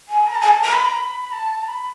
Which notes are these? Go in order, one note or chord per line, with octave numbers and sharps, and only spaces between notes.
G#5
A#5
A5
G#5
A5
A#5
B5
A#5
B5
A5
A#5
B5